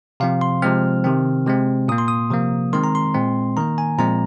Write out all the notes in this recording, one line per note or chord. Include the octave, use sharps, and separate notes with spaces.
C3 F3 C4 F5
C6
C3 F3 G#3 C4 F6
C3 D#3 C4
C3 G#3 C4
A#2 A#3 D#6
C6
D#6
C3 F3 A#3
D#3 G#3 C4 C6
A#5
C6
A#2 G#3 C4
D#3 A#3 A#5
G#5
A#2 F3 G#3 C4 A#5